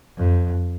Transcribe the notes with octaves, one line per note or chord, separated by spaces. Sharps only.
F2